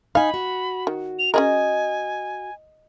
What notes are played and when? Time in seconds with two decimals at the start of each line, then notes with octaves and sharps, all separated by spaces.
0.15 D#4 F5 G#5 B5
0.34 F#4
0.87 D#3
1.19 F7
1.34 C#4 G#4 A#4 D#5 G#5